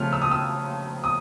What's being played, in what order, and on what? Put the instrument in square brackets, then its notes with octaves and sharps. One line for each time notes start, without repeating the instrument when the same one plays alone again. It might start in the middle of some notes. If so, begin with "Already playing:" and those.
Already playing: [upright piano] C#3 F3 A3 C4 F6
E6
D#6
E6
D#6